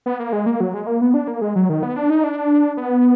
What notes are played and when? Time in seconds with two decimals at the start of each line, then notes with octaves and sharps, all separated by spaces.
0.06 B3
0.20 A#3
0.33 G#3
0.46 A#3
0.60 F#3
0.74 G#3
0.87 A#3
1.01 B3
1.14 D4
1.28 A#3
1.41 G#3
1.56 F#3
1.69 D#3
1.83 B3
1.96 D4
2.10 D#4
2.24 D4
2.77 B3